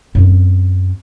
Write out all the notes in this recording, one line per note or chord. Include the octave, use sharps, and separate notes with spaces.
F#2 C4